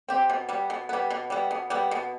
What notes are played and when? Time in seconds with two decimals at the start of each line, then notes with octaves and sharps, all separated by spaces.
0.09 C4 G4
0.30 B2
0.49 G3 B3
0.70 B2
0.89 G3 B3
1.10 B2
1.30 G3 B3
1.51 B2
1.70 G3 B3
1.91 B2